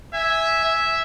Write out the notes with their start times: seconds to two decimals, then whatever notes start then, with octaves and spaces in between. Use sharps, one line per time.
0.14 E5 G#5
0.64 E5